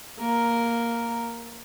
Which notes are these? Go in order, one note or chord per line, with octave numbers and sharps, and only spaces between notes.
A#3 A#4